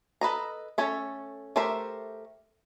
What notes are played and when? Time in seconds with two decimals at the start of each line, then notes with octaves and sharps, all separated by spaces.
0.21 A4 B4 D#5 A#5
0.78 A3 C#4 A4 C#5 E5
1.56 A3 G4 A#4 C5 E5